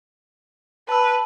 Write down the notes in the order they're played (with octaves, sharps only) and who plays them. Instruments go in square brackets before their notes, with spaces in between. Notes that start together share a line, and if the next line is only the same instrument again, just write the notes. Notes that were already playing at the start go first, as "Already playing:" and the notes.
[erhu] B4 [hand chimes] A5 E6